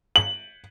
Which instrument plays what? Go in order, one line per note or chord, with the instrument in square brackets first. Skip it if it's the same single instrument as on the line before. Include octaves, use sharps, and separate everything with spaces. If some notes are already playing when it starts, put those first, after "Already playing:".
[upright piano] F#7